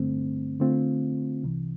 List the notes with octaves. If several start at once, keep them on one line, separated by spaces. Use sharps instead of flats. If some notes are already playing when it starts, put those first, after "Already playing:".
Already playing: G2 D3 A3 C4
D3 A3 C4 F4
C2 C3 E3